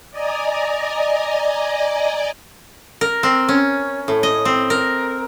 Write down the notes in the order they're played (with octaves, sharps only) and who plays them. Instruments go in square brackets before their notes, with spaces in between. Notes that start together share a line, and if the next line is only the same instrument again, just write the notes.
[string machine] D5 D#5 G#5 A#5
[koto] A#4
C4
C#4
A2
D#5
C4
A#4